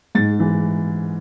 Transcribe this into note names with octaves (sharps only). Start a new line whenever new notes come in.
G#2 A6
E3